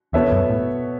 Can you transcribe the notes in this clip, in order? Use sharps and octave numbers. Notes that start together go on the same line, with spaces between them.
E2 B2 B3 A4 C#5 E5
F#2
A2